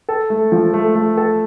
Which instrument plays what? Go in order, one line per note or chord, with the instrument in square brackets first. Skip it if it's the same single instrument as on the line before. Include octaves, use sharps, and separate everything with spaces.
[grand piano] A4
A3
F3
A3
A3
A4